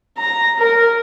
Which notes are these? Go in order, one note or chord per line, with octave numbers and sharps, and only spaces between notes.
A#5
A#4